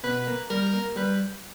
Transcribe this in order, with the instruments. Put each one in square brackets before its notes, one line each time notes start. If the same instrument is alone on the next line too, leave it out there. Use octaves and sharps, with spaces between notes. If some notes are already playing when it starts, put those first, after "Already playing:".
[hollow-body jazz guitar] B2 [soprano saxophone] B4
[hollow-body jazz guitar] A#3
[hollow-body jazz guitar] G3 [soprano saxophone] A#4
[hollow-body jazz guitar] A#3
[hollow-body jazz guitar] G3 [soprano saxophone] B4